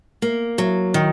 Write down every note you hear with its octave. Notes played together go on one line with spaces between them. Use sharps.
A#3
F#3
D#3